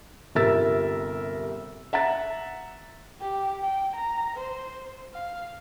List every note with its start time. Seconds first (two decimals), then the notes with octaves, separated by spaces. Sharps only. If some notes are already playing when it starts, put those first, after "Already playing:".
0.35 G1 C3 A#4 E5 E6 A6
1.93 E5 F#5 A#5 A6
3.21 G4
3.62 G5
3.96 A#5
4.36 C5
5.13 F5